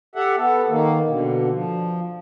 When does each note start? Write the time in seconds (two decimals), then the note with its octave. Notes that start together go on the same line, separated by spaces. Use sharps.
0.16 G4 A4 E5 F#5
0.37 B3 A4
0.69 D#3 A#3
1.08 B2 D3
1.52 F3